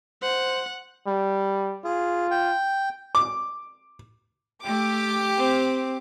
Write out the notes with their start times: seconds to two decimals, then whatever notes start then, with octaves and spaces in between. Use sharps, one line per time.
0.22 C5 F#5
1.07 G3
1.84 F4 G#4
2.31 G5
3.15 D6
4.63 A3 G4 D6
5.37 C4